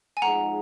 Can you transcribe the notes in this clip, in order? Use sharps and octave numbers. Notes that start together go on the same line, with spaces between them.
G#5
F2 F3 G#3 D#4 G#4 F#5 A#5